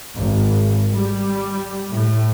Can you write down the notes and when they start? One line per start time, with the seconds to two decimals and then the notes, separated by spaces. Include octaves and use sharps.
0.16 G#1
0.92 G3
1.93 A2